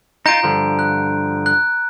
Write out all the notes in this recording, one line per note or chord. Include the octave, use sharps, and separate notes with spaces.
D#4 F4 A#5 G6 D7
G2 D3 F3
F#6
F#6